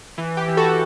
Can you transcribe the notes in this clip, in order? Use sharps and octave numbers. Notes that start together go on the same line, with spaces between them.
E3
G4
E3
F#4 A4